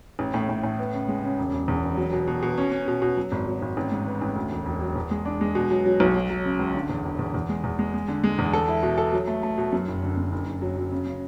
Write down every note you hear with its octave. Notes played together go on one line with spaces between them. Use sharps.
A1
A2
A2
A2
B3
C#3
G#3
C#3
E1
E1
E2
E1
F#3
B2
B2
B2
C#4
C#4
B2
B2
F#3
G#1
F#3
G#1
A1
G#2
B3
A1
D2
E1
E1
F#3
E2
G#3
D4
G#3
B2
F#3
F#3
B1
F#3
F#3
C#3
C#2
D3
E2
E1
E2
E2
G#3
E2
G#3
G#3
D3
G#3
E2
A4
E4
B2
A4
F#3
A3
A3
B2
F#2
F#1
D3
F#2
F#1
F#1
F#3
F#3
C#3
C#3